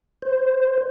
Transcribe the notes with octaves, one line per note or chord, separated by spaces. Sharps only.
C5